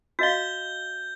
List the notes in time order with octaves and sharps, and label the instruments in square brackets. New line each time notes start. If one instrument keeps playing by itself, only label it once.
[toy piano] F#4 D#5 F5 [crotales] G6 G7